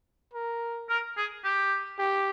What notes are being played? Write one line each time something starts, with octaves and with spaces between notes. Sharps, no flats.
A#4
A#4
G#4
G4
G4